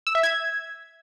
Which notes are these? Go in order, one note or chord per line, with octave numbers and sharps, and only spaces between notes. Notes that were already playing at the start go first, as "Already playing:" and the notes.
E6
E5
G#6